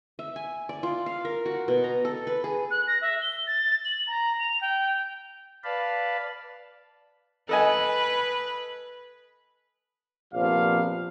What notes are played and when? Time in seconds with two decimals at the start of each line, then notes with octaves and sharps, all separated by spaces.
0.19 E5
0.36 G#5
0.69 D5
0.83 F4
1.06 F5
1.25 A#4
1.46 F#4
1.68 B2
1.84 A#5
2.05 A4
2.27 B4
2.44 G#4
2.71 F#6
2.88 A#6
3.02 E5
3.22 G7
3.47 A6
3.85 F#7
4.07 A#5
4.39 F7
4.61 G5
5.64 B4 D5 F5 A5 B5
7.49 A4 B4 D#5 G#5
10.34 A#1 C3 F3 B3 D5 F5